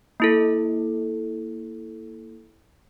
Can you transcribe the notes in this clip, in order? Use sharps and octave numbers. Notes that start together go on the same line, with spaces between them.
A#3 E4 A4